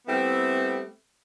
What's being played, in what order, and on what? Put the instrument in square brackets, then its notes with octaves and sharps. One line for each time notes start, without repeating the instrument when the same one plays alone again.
[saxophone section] G3 A3 B3 C4 E4